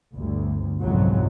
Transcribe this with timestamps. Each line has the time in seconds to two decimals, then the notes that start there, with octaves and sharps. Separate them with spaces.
0.14 G1 D2
0.82 G1 C2 F2 G#2 F#3